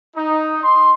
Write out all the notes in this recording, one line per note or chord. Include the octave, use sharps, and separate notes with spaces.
D#4
C6